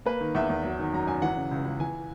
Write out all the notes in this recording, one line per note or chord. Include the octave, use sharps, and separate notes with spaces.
A#3 B4
D#3
E2 E5
E2
F#3
D#3
F#2 A#5
F#2 G#5
E3 F#5
C#3
C#2
C#2
E3 G#5